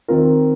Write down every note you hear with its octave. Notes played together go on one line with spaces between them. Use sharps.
D#3 C4 F4 A#4